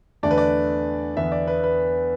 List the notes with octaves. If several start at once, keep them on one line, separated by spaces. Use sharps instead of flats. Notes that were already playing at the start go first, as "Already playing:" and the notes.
E2 D3 A3 D4 D5
B4
D5
E2 D3 B3 E5
D5
B4
B4